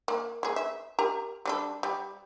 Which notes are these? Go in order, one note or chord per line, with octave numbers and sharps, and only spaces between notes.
A#3
A#3 G#4
E5
G4 A#4 A#5
G3 D4 A4
G3